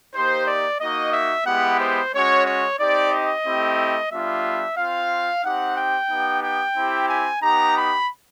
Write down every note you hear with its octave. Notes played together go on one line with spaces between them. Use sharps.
A#3 D#4 G4 C5
D5
A#3 D#4 F#4 D#5
E5
G#3 B3 E4 G4 F#5
C5
G#3 C#4 F#4 C#5
C#5
C4 D#4 G4 D5
D#5
A3 C4 E4 G4
G3 B3 D4 F4 E5
C4 F4 F5
C4 D#4 G4 F#5
G5
B3 D#4 G4
G5
C4 E4 G4
G#5
B3 D#4 G4 A#5
B5